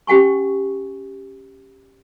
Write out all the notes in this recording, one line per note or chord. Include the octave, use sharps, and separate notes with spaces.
C#4 G4 F#5 G#5 C#6